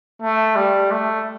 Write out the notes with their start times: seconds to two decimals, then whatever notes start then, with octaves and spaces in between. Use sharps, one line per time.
0.22 A3
0.56 G3
0.91 A3